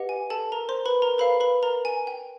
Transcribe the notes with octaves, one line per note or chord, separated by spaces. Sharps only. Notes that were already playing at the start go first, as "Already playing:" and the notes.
Already playing: G4 B4 D#5 F#5
G#5
A4 A5
A#4 A#5
C5 C6
B4 B5
A#4 A#5
A4 B4 C5 F5 B5
B4 B5
A#4 A#5
G#5
G5